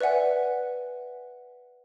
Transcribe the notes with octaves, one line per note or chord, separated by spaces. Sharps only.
B4 D5 E5 F#5 G#5